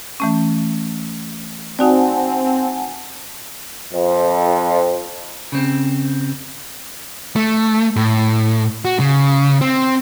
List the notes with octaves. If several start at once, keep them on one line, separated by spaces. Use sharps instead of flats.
E3 A3 C#4
C4 D#4 F#4 D5 F#5 G#5 A5
F2
C#3 C4
A3
A2
F#4
C#3
C4